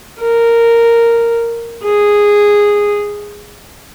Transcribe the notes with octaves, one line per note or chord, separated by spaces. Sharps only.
A#4
G#4